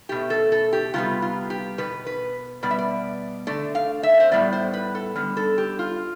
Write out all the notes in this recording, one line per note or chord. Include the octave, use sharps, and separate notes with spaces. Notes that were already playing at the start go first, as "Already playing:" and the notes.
B2 A3 G4
A4
A4
G4
C3 G3 B3 F4
F4
G4
B2 B3 B4
B4
B2 G3 B3 D5
E5
D5
D3 A3 D5
F5
E5
C5
A2 G3 B3 D5
C5
B4
A4
D3 G3 B3
A4
G4
F4